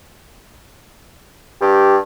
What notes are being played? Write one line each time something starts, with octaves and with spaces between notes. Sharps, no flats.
G2 G4